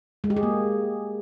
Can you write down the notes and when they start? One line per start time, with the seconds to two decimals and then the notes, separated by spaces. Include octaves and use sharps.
0.24 G#3
0.30 G4
0.37 G#4
0.43 A#3